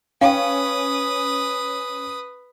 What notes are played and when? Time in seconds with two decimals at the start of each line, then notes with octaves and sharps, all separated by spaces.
0.21 C#4 B4 F5 G5 D#6